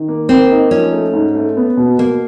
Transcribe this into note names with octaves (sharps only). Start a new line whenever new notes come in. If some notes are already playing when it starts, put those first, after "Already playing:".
Already playing: D#3
A#3
A#3 C4
D#4
F3 C#4
A3
G#2
A3
B3
B2
B2 A#3